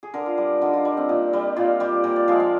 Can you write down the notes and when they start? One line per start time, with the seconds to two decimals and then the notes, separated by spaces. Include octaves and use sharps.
0.03 G#4
0.14 D3 A#4
0.26 F4
0.38 G3
0.61 D3 D#4
0.74 F4
0.85 G3
0.97 C4
1.09 A#2 D#4
1.33 G3
1.56 A#2 F4
1.80 G3 G4
2.04 A#2 A#4
2.16 D5
2.28 F3 G#3 F5
2.40 F5